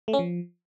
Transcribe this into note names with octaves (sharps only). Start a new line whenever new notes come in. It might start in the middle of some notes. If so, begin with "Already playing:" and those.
A3
C#4
F3